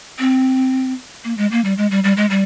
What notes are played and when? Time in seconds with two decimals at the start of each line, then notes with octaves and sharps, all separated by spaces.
0.19 C4
1.24 A#3
1.38 G#3
1.51 A#3
1.64 G3
1.78 G#3
1.91 G3
2.04 G3
2.17 G#3
2.30 G3